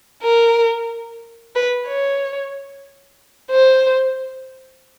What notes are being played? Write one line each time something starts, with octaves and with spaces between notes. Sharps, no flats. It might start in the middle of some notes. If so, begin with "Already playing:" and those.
A#4
B4
C#5
C5